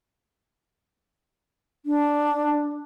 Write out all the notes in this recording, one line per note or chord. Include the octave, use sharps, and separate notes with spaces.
D4